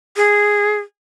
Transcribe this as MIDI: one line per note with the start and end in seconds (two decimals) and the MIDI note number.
0.16 0.78 68